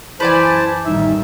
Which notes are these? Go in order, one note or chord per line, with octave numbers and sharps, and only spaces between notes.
F#2 E3 E4 B4 C5 D5 G#5 A5
A1 D#3 G3 D#4 E5